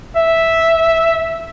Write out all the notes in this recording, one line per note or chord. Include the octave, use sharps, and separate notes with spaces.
E5